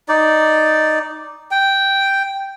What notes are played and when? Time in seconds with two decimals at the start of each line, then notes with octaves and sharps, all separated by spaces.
0.09 D#4 D5
1.51 G5